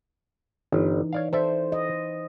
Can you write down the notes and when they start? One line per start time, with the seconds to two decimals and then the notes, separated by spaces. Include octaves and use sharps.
0.72 G1 E3 D#4
1.13 C#5 D5 F5
1.33 A4 C5 D5 E5
1.72 D#5